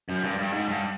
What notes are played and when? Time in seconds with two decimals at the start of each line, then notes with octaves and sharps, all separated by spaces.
0.09 F#2
0.24 G2
0.39 G2
0.53 G#2
0.69 G2